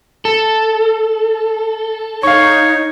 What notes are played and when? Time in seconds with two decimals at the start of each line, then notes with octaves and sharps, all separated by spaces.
0.25 A4
2.23 D#4 C#5 F5 C#6